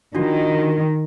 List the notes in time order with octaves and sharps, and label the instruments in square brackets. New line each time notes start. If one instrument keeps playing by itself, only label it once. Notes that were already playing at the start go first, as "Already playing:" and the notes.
[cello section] D#3 [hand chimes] D4 F4 F#4